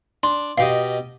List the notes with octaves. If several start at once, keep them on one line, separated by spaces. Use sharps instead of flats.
D4 C6
B2 G4 D#5 F5